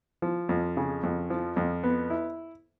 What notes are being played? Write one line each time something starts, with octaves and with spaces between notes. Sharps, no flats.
F3
F2
C#3
F2
F3
F2
B3
E4